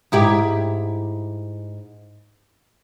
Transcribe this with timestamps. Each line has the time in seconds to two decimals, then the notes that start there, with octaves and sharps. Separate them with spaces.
0.12 G#2 E4 G4